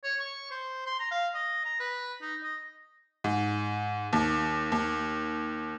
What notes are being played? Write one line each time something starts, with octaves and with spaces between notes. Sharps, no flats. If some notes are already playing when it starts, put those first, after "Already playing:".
C#5
C#6
C5
C6
A#5
F5
D#5
A#5
B4
D#4
D#5
G#2
D#2
D#2